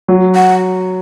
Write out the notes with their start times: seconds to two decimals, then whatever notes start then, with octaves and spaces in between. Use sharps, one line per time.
0.08 F#3
0.35 F#5